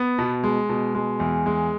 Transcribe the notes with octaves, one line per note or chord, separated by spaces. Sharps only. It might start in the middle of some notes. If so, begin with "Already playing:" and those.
Already playing: B3
B2
G#3
B2
G#3
E2
G#3